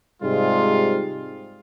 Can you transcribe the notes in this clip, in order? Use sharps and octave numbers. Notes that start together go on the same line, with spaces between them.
G#2 C3 G3 G#3 F4